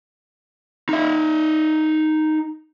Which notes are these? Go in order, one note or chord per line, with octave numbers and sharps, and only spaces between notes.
D#4 E5